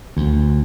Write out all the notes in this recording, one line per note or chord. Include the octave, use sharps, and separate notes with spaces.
D2